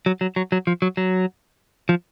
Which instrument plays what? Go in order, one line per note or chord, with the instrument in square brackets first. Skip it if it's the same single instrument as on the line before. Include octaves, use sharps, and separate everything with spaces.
[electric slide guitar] F#3
F#3
F#3
F#3
F3
F#3
F#3
F3